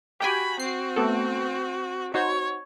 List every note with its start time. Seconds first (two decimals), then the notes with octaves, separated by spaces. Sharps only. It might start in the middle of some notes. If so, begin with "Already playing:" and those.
0.20 F#4 G4 G5 G#5 B5
0.60 C4 F#4 C7
0.96 A3 B3 A4
2.14 D#4 F#4 C5 C#5